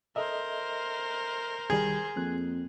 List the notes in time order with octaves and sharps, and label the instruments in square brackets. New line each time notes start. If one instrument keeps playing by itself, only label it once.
[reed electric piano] A4 D#5 E5 [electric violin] A#4 C5
[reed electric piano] C2 D#3 G3 [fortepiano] G#4
[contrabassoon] F2 [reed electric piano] A#3 C4 F#6